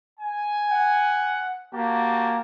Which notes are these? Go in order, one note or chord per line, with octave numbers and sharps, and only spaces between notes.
G#5
F#5
A#3 F#4 G4 A5